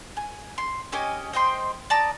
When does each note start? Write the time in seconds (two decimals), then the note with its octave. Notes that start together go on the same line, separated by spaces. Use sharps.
0.17 G#5
0.58 C6
0.92 C#4 G4 D#5 G#5
1.33 C5 D#5 G5 C6
1.90 D5 A5 A#5 D#6